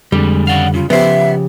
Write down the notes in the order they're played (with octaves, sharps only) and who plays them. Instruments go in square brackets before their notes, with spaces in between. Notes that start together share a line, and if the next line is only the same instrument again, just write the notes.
[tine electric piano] F2 D3 [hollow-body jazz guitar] G3 [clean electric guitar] G#3 G4
[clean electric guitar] C#3 D5 F5 [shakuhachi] F#5
[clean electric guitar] C#3 [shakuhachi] F4
[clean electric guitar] C#3 [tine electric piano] F3 G4 [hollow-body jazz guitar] B3 C5 [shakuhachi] E5